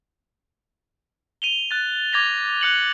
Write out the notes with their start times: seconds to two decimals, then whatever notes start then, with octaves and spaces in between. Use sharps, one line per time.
1.42 D#7 F7 G7
1.71 F#6 A6
2.13 D6 G#6 A#6 F7
2.61 F#6 C#7 F#7